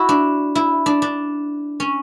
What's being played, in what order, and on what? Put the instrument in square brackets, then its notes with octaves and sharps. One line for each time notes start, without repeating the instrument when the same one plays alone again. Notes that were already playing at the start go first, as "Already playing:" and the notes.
Already playing: [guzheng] E4 F#4
D4
E4
D4
D4
C#4